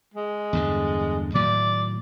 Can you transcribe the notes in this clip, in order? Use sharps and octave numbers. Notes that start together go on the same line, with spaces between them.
G#3
E2 G2 D3
A2 D#3 F#3 D5